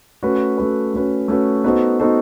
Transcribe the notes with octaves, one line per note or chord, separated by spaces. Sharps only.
A3 C#4 F#4 B4
A3 C#4 F#4 B4
A3 C#4 F#4 B4
A3 C#4 F#4 B4
B3 D#4 F#4 A4 C5
B3 D#4 F#4 A4 C5